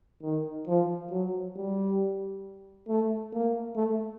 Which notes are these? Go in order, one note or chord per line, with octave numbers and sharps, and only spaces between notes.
D#3
F3
F#3
G3
A3
A#3
A3